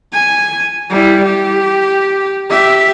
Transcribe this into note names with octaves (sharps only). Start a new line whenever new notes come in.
G#5
G3 E4
G4
G4 E5